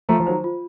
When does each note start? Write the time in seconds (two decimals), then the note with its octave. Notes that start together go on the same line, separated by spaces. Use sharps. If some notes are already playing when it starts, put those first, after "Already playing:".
0.09 F3 A3 A#5
0.20 F3
0.27 D#3 F#3 C5
0.44 F4